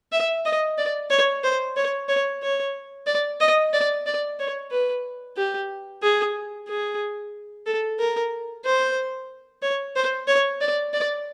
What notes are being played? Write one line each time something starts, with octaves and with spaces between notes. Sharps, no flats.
E5
D#5
D5
C#5
C5
C#5
C#5
C#5
D5
D#5
D5
D5
C#5
B4
G4
G#4
G#4
A4
A#4
C5
C#5
C5
C#5
D5
D5